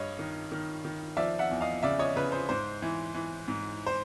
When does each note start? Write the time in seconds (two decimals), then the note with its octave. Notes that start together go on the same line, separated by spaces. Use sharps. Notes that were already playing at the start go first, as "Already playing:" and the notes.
Already playing: G2 C#5 D#5
0.19 D#3
0.52 D#3
0.85 D#3
1.17 F3 D5 E5
1.39 E5 F#5
1.51 E2
1.61 D#5 F5
1.83 C#3 D5 E5
1.99 C#5 D#5
2.16 C#3 B4
2.32 C5
2.49 G#2 C5
2.82 E3
3.14 E3
3.48 G#2
3.87 C5